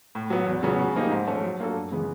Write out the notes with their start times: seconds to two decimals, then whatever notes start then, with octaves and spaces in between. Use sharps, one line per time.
0.15 A2
0.30 F#3 B3
0.46 E2
0.63 C#3 F#3 B3
0.79 C#3
0.95 F3 A#3 D#4 G4
1.11 G#2
1.27 F3 A3 C#4
1.43 F#3
1.60 A#3 D4 F#4 A4
1.76 F#2
1.92 C#3 E3 G#3 B3